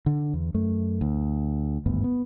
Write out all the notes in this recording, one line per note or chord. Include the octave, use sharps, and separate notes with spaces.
D3
E2
F#2 A3
D2
G#1 D2 G2 B3
B3